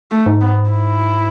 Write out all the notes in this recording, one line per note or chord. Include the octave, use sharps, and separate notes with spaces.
A3
G#2
B3
E4